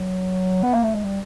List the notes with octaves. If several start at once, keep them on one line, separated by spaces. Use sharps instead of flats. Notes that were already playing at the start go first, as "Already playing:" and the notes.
Already playing: F#3
B3
A#3
A3
G#3
G3